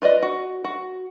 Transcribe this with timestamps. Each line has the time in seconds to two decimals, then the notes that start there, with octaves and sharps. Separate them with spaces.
0.02 F4 B4 D5 D#5
0.22 F#4
0.64 F#4